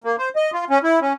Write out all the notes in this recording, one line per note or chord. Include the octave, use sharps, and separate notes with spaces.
A#3
C5
D#5
F4
C#4
E4
C#4